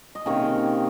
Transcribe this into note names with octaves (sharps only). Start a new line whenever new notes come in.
D#5
C3 D#3 A#3 C#4 A#4 C#5